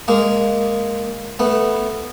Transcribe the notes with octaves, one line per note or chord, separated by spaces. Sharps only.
G#3 A#3
A3 B3